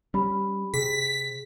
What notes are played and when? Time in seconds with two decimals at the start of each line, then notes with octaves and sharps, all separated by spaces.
0.14 G3 C#4 G4 B5
0.74 C3 G#4 B6